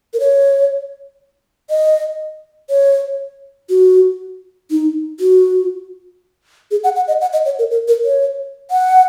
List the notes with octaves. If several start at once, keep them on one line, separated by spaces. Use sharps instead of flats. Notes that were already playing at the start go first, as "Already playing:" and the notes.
A#4
C#5
D#5
C#5
F#4
D#4
F#4
G#4
F#5
F#5
D#5
F#5
D#5
C#5
A#4
A#4
A#4
C#5
F#5